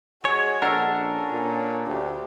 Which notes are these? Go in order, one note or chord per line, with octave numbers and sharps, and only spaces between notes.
G#3 F#4 C#5 G#5 G#6 C#7
A#1 D4 A4 A#4 F#5 E6
C#4
A#2
D2 G4